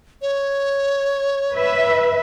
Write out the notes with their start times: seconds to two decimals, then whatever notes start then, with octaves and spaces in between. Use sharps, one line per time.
0.22 C#5
1.54 B4 E5